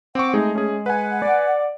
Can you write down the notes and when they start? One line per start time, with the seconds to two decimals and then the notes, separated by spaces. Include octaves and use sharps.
0.15 C4 F#5 C#6 D6
0.34 G#3 A3 D#4 G#4
0.55 C#4 G#4
0.86 B4 F#5 G#5
1.22 D5